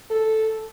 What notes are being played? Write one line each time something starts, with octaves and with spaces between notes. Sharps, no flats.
A4